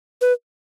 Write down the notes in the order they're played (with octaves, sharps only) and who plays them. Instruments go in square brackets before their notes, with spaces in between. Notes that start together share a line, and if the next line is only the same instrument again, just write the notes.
[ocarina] B4